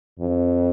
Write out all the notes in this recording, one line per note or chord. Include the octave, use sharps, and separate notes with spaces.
F2